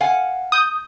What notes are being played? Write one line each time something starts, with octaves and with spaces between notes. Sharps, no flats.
F5 F#5 G#5
D#6 G6